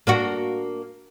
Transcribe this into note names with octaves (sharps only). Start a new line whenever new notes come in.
A#3 D4 F#4